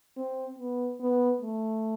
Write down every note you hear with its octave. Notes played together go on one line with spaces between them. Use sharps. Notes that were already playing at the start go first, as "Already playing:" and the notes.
C4
B3
B3
A3